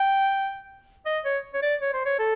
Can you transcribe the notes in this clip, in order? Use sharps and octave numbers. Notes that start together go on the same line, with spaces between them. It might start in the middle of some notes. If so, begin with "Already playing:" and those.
Already playing: G5
D#5
C#5
C#5
D5
C#5
C5
C#5
A4